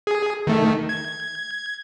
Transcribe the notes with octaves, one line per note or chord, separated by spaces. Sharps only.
G#4
D#3 A3
G#6